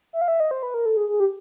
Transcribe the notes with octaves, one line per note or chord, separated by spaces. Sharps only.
E5
F5
E5
D#5
C5
B4
A#4
A4
G#4
G#4
G4